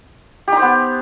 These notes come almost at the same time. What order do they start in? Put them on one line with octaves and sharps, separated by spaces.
G4 D#4 C5 B3